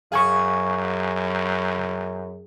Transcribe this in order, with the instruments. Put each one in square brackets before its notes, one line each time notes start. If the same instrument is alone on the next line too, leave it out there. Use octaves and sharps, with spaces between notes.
[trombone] F#2 [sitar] G#4 [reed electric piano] F5 G#5 C#6